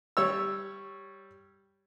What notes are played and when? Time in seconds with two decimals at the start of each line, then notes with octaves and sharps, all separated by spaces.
0.17 G3 C#5 E6